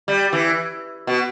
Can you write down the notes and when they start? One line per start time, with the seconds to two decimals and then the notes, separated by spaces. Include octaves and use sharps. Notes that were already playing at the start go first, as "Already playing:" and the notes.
0.08 G3
0.33 E3
1.07 B2